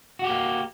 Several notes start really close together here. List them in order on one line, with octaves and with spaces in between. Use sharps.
F#4 G4 A#3